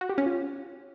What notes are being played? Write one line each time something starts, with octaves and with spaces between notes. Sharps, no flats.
F#4
G4
C#4
F4